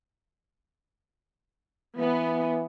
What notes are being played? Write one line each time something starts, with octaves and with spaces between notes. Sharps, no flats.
E3 B3